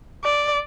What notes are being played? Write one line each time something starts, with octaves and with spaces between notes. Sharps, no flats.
D5